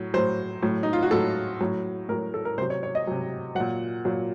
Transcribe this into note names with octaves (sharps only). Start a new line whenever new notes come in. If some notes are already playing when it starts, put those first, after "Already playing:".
Already playing: A2 F#3
A2 F#3 C5
A2 F#3
D#4
F4
F#4
A2 F#3 A4
A2 F#3
A2 F#3 A#4
A4
A#4
C3 F#3 C5
C#5
C#5
D#5
C3 F#3
A#2 F#3 F#5
A#2 F#3